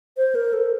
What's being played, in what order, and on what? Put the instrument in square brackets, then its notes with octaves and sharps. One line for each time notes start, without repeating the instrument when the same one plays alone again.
[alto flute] C5
A#4
A4